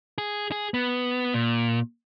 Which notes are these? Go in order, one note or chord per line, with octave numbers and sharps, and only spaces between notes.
G#4
G#4
B3
A#2